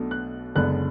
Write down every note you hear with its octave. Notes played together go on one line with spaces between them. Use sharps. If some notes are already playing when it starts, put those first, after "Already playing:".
Already playing: B1 B2 A3 D4
F#6
F#1 F#2 D3 G#3 B3 F#6